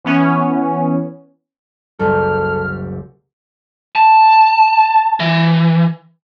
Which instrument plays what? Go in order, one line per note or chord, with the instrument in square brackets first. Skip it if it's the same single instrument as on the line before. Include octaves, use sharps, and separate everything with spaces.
[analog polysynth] E3 B3 C#4
[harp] F#1 C2 [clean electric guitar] A4 [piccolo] F6
[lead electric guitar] A5
E3